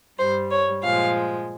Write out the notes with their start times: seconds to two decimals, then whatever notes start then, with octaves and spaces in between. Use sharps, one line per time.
0.18 G2 G3 C5
0.51 C#5
0.83 A#2 F3 G#3 F5